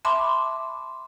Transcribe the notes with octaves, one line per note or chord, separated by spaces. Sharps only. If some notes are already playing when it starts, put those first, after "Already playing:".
E5 A5 B5 C6 D6